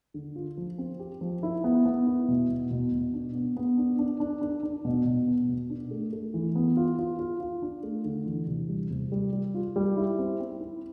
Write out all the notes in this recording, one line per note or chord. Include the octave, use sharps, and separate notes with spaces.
D3
F4
F3
C4
G4
F3
E4
B3
B3
E4
B2
B2
B2
B2
D4
B3
B3
D4
D4
D4
D4
D4
B2
B2
B3
B2
D4
A3
A3
E3
B3
F4
F4
F4
F4
D4
A3
D3
E3
C3
G3
C3
G3
G3
F4
G3
E4
C4
C4
E4